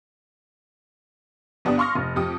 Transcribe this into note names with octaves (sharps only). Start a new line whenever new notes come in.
G1 B3 D4 G4 D5 D#6
F5 C6 C#6 F6 A#6
F1
F2 G4 D#6